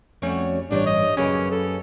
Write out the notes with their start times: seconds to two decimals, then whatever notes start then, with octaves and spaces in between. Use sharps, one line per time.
0.22 F2 G3 A3 C#4 F#4 C#5
0.71 A1 G2 G3 D4 D#4 C#5
0.86 D#5
1.17 F#2 C#3 A#3 C#4 G4 B4 G#5
1.51 A4